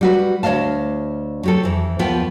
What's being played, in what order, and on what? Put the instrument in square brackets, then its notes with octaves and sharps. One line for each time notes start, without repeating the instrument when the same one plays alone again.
[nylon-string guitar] G3 F#4 B4
D2 C#5 D#5 F5 A5
F#3 G4 A4
F2 E3
D#2 F3 B3 F4 B4 G5